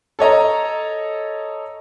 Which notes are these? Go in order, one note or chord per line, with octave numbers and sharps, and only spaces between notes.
A4 C#5 D#5 A#5